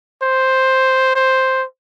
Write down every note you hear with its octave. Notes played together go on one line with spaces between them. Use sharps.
C5
C5